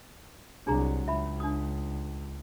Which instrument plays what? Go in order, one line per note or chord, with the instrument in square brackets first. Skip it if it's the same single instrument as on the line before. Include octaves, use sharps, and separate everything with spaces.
[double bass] C2 F#3 [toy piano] D4 G#4 A#5
[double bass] C#2 [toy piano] E5 B5
[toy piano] D4 D#6